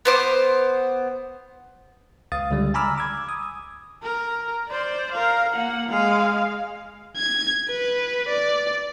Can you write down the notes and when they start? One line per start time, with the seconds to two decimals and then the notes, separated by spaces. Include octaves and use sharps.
0.05 B3 C5 D6
2.32 C#2 F5 D#6 A6
2.51 C#2 D3 G3
2.74 G#5 A#5 B5 D6 E6 F6
2.98 D6 E6 G#6
3.29 D#6
4.03 A#4
4.68 C5 D5
5.12 A#4 F5
5.54 A#3 F#5
5.89 G#3 F5
7.17 G#6
7.69 B4
8.29 D5